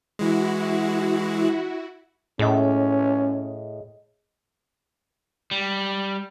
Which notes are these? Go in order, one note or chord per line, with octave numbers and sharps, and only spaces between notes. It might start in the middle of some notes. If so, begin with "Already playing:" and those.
E3 G#3 E4 F#4
A2 C#4 G#4 D#5
G3